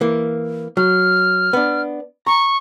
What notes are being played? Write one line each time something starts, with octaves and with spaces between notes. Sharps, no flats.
E3 A#3
F#3 F6
B3 D4
A#5 C#6